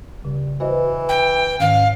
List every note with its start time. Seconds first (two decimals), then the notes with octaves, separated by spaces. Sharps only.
0.25 C#3 G3
0.60 E3 F#4 B4 C5 D#5
1.08 G5
1.59 G#2 D#3 C#4 F5